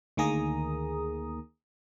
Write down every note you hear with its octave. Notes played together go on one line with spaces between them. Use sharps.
D2 D#3 A#3 G#4 A#5 D#6